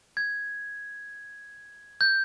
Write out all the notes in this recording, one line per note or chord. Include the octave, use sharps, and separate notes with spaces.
G#6
G6